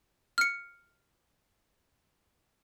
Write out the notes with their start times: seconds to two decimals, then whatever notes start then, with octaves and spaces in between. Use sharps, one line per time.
0.38 F6 C#7